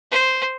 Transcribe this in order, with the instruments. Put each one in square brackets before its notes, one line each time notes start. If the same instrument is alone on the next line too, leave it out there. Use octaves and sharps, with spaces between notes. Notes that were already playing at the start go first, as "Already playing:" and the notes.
[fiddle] C5